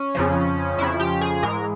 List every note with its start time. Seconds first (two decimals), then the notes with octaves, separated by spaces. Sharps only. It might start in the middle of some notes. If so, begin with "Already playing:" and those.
Already playing: C#4
0.15 F2 C#3 F3
0.78 F2 C#3 F3 E4
1.00 G4
1.21 G#4
1.43 G#2 E3 G#3 A#4